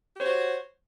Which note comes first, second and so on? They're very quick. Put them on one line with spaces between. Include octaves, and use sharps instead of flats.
G4 C5 C#5 F#4